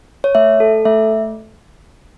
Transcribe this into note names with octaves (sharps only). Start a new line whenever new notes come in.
C#5
A3 E5
A4
A3 E5